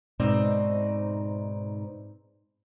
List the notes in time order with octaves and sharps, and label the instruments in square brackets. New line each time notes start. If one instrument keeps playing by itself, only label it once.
[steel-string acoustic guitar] G#2 B2 C4 D#4 D5